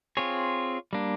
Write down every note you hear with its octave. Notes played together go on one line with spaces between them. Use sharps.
C4 F4 G#4 C#5
G3 A#3 D4